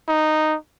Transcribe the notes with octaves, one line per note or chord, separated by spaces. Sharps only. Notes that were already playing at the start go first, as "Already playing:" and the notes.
D#4